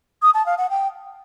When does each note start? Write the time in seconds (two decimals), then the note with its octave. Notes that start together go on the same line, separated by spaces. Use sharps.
0.22 D#6
0.34 A5
0.46 F5
0.58 F#5
0.70 G5